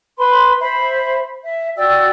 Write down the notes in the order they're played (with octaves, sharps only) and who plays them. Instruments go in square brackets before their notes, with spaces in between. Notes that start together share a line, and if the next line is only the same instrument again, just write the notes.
[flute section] B4 B5 C6
C5 E5 B5
E5
F#4 D5 G5 E6